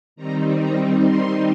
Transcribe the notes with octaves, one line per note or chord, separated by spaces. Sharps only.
D#3 G3 C4 D#4 A#5
A#5
C6